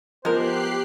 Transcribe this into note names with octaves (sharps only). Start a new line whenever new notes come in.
F3 G#3 B3 G4 A#4 C5 F#6 C7